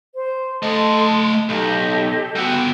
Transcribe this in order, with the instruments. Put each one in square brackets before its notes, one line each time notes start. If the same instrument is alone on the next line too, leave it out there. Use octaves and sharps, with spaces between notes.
[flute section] C5
[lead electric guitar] A3 D#5 [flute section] A4 A5 C6
[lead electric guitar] B1 [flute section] G4 A4 D#5
[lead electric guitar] G3 B3 [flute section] F#4 G5 E6